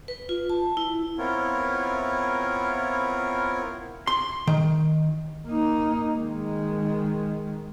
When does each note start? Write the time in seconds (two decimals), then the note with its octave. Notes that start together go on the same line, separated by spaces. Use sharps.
0.08 B4
0.29 F4
0.50 A5
0.77 E4
1.18 B3 C4 E4 F4 A#4 C#5
4.07 C6
4.47 D#3
5.46 A#3 D#4
6.16 D#3 G#3